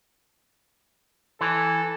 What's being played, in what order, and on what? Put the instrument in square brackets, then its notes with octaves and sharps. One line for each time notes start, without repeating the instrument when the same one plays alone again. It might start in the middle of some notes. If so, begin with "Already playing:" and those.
[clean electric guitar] E3 [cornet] A4